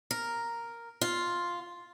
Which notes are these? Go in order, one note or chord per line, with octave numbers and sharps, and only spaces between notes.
A#4
F4